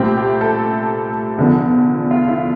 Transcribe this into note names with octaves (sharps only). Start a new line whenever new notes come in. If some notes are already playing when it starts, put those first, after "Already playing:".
Already playing: C2 A#2 A3 C4 G4
G4
A4
F1 E2 D3 F3
F4
E4